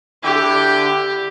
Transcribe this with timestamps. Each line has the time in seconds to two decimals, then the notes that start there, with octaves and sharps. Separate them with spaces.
0.24 D3 E4 G4 G5